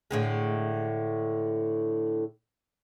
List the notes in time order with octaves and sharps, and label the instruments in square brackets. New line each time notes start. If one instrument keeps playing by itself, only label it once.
[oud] A2 D3 G#3